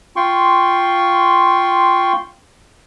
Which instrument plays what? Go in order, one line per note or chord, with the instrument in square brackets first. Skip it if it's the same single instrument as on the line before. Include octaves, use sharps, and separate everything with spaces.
[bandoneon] F4 G5 C6 C#6